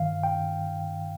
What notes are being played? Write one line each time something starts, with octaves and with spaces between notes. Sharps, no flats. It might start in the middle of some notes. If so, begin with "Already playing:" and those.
Already playing: G2 D#3 F5
G5